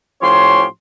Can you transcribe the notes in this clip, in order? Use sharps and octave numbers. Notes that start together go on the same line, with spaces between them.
A2 F3 C#4 G4 C#5 C6